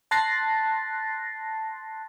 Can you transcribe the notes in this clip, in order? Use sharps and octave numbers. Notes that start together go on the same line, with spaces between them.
A5 C6 F#6 A6 A#6 C7